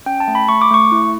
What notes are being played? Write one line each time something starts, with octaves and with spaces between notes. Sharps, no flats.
C#4 G5
A5
A3
B5
A3 C#6
D6
A3 C#6
E4